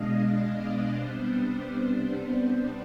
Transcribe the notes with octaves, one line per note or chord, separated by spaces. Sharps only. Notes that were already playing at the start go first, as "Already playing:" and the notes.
Already playing: B2 G#3 D4 D#5 F5
D#5
D5
C3 G3 B3 D4 C5